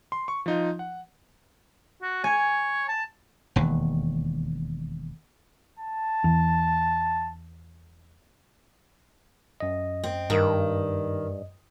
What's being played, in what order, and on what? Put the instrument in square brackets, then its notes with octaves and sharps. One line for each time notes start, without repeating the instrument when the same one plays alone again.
[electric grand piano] C6
C#6
F3 D#4 F4
F#5
[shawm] F#4
[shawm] C#5 [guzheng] G#5
[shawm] A5
[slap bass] E1 D#2
[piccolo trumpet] A5
[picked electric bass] E2
[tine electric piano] F#2 D#5
[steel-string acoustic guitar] C4
[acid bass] G2 [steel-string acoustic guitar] D#3